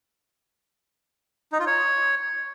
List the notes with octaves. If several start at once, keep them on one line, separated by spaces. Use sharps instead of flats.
D#4
F4
C#5